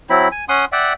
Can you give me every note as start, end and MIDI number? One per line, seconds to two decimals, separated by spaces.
0.10 0.28 54
0.10 0.28 60
0.10 0.28 64
0.10 0.28 83
0.32 0.45 80
0.49 0.65 61
0.49 0.65 78
0.49 0.65 84
0.49 0.65 87
0.72 0.93 74
0.72 0.93 76
0.72 0.93 78
0.72 0.93 79